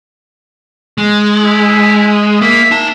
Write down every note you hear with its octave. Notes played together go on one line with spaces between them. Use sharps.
G#3
E4
A#3 A#4 E5
D#4 A5